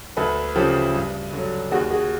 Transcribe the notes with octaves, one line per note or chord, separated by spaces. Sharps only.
D2 A4 B4
C#3 F3 G4 A4
G2
D3 F#3
D#2 F#4 G#4
F#4 G#4